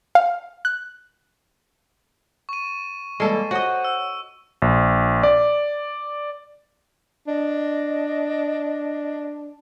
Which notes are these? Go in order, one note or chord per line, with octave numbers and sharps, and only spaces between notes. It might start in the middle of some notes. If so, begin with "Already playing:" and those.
F5
F#6
C#6 D#7
E3 G3 G#3 A#3 A4
F#4 C5 C#5 D#5 F#5
E6
A#1
D5
D4 D#5